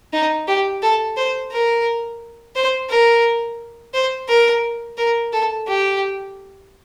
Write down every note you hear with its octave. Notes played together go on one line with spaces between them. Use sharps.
D#4
G4
A4
C5
A#4
C5
A#4
C5
A#4
A#4
A4
G4